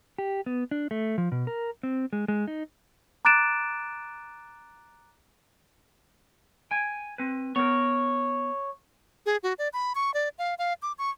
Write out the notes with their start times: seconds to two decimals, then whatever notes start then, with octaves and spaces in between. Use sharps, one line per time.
0.18 G4
0.46 B3
0.71 D4
0.91 A3
1.18 F3
1.32 B2
1.47 A#4
1.83 C4
2.13 G#3
2.28 G#3
2.47 D#4
3.25 A#5 D6 F#6 A6 D7 E7
6.71 G5 G#5
7.18 C4 B4
7.56 B3 A#4 C#5
9.26 G#4
9.43 F#4
9.59 D5
9.73 B5
9.95 C#6
10.14 D5
10.38 F5
10.59 F5
10.82 D6
10.98 C#6